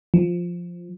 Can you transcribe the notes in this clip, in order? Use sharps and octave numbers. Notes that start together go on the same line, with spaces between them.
F3